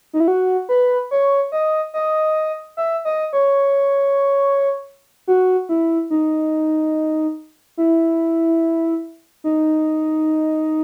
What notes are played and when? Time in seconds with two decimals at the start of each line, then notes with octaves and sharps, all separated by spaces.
0.13 D#4
0.20 E4
0.28 F#4
0.69 B4
1.11 C#5
1.52 D#5
1.94 D#5
2.77 E5
3.05 D#5
3.33 C#5
5.27 F#4
5.69 E4
6.10 D#4
7.77 E4
9.44 D#4